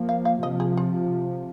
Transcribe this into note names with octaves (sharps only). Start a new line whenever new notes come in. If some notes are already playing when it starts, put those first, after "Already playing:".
Already playing: F3 A#3
F5
F5
C3 F3 D#5
G#4
F4